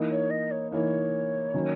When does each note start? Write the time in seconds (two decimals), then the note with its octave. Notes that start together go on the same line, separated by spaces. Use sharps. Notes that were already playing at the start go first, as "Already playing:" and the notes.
Already playing: E3 A#3 D#4
0.11 C#5
0.30 D#5
0.51 C#5
0.71 E3 A#3 D#4 C#5
1.54 D#3 F#3 A#3 C#4